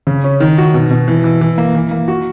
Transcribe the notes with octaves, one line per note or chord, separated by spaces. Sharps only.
C#3
C#4
D#3
F#4
B2
B2
E3
E3
E3
A#3
E3
A#3
F#4